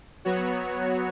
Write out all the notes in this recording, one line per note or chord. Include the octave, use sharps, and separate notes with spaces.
F#3 B3 F#4 C#5